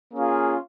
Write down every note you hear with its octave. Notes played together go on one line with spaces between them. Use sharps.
A#3 C#4 F4 G#4